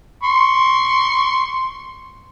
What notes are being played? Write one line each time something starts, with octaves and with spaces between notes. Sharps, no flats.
C6 C#6